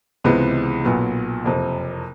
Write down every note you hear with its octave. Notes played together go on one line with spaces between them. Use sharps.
C#2 C3 E3 G#3 B3
B1 A#2 F#3 B3
F#1 F2 C3